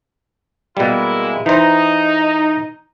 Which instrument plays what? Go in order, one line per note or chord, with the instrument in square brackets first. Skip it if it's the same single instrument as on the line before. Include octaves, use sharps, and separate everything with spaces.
[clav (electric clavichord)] B2 G3 [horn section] G#3 A#3 E4
[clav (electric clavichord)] E3 C5 [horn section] D#4